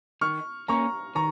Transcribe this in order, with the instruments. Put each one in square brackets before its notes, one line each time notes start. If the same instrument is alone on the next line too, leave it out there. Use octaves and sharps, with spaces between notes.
[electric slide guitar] D#3 [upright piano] C#6 F6
[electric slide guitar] A#3 C#4 [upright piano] A#5 C#6
[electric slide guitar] D#3 [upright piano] A#5 C#6